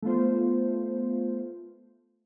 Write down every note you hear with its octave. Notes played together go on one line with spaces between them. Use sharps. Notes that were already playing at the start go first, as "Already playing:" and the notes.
A3 B3 F4 C5